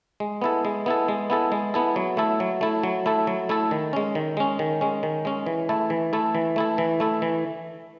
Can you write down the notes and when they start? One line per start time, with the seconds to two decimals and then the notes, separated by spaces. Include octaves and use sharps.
0.20 G#3
0.42 B3 E4 A4
0.65 G#3
0.86 B3 E4 A4
1.08 G#3
1.30 B3 E4 A4
1.52 G#3
1.74 B3 E4 A4
1.96 F#3
2.17 A3 E4 A4
2.40 F#3
2.61 A3 E4 A4
2.83 F#3
3.06 A3 E4 A4
3.27 F#3
3.49 A3 E4 A4
3.71 D#3
3.93 G#3 C#4
4.15 D#3
4.37 G#3 C#4
4.59 D#3
4.81 G#3 C#4
5.03 D#3
5.25 G#3 C#4
5.46 E3
5.69 A3 E4 A4
5.90 E3
6.13 A3 E4 A4
6.35 E3
6.56 A3 E4 A4
6.78 E3
7.00 A3 E4 A4
7.22 E3